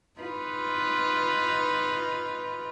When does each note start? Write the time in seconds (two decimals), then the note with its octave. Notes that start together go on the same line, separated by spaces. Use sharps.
0.21 D#4 F4 B4